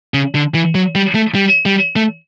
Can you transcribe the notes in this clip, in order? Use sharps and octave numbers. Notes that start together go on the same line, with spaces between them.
C#3
D3
E3
F#3
G3
A3
G3
G3
A3